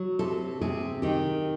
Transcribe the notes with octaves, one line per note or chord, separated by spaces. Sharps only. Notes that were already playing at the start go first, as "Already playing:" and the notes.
Already playing: F#3
C3 A4
C3 G#4
D#3 G4